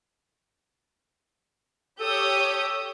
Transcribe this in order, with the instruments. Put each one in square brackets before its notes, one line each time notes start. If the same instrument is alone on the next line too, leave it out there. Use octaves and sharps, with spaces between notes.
[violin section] G4 C#5 [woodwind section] A4 E6 [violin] D#6 G6